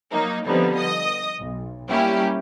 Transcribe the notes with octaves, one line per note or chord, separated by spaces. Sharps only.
F#3 A#3 D#4
D3 F3 G3 B3 C4 D#4
D#5 D#6
B1
G3 A#3 C#4 E4 G4